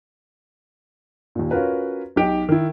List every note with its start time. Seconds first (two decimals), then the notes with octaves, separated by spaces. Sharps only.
1.35 D#2 A#2
1.51 C#4 F4 F#4 A#4 B4
2.16 B1 D#4 G4 D7
2.49 D#3 E4